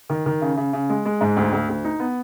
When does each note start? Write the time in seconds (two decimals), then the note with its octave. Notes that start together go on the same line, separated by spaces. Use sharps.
0.10 D#3
0.26 D#3
0.41 C#3
0.57 C#3
0.73 C#3
0.90 G#3
1.05 G#3
1.21 G#2
1.37 D2
1.53 D2
1.69 D2
1.84 D#4
2.00 B3